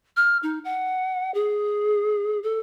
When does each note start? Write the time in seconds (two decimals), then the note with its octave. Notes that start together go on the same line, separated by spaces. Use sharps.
0.17 F6
0.43 D#4
0.65 F#5
1.34 G#4
2.43 A4